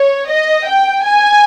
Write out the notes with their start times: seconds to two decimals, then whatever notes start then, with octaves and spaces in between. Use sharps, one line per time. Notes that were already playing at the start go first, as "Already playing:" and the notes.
Already playing: C#5
0.29 D#5
0.66 G5
1.04 G#5